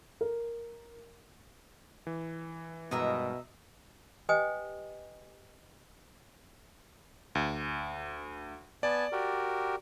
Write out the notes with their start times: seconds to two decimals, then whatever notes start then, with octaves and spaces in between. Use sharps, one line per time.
0.21 A#4
2.07 E3
2.91 G2 B2 D#3 G#3 D#5 E5 A#5
4.29 G4 B4 D#5 G5 G#5 D#6
7.35 D2
8.83 B3 D5 G#5 A5
9.12 F#4 G4 A#4